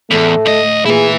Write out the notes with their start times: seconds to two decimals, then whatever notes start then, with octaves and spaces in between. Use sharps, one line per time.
0.11 E2 A2 A3
0.46 D2 D#5
0.86 A#2 E4 G#4 B4